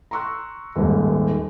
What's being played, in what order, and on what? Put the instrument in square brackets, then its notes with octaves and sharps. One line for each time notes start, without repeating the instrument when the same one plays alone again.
[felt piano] A#5 C6 C#6 E6 F#6
D#1 G#1 D#2 G#2 D#3